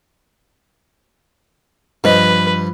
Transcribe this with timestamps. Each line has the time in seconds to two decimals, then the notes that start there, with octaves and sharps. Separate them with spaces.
2.04 G2 F3 B4 C5 D#5